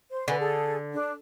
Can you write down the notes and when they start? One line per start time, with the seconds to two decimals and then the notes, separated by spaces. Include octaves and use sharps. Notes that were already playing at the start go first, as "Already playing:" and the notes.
0.11 C5
0.28 D3 B4 G#5
0.39 G#4 A4
0.93 D4